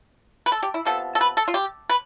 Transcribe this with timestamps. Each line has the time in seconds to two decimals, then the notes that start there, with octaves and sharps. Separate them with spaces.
0.46 B4
0.52 A4
0.63 G4
0.74 E4
0.85 C3 F3 B3 A4
1.15 A4
1.21 B4
1.37 A4
1.48 F4
1.54 G4
1.89 B4